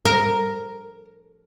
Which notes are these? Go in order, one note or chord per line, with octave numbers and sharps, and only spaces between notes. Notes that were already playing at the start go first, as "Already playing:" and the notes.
A#4